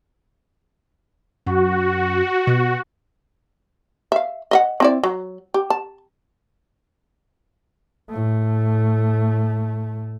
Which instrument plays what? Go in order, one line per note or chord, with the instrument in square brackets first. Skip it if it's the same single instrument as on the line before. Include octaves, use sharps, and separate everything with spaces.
[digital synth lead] F#2 [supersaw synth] F#4
[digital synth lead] B2
[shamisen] E5 F5
D#5 E5 F#5
C4 E4 D5
F#3
G4
A5
[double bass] A2 A3